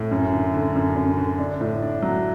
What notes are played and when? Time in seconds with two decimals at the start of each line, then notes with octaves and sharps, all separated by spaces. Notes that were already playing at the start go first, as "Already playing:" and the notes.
Already playing: A2
0.11 F#2
0.33 D3
0.54 D3
0.75 F#2
0.96 F#2
1.18 D3
1.39 D4
1.61 A2
1.82 D4
2.02 F#3